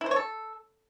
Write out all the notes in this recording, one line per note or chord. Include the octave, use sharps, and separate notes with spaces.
E4
C5
C#5
A4